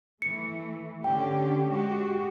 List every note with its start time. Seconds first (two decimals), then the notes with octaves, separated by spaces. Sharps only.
0.22 E3 A3 C#7
1.04 D3 C#4 G4 G5
1.70 G#3 F#4 G4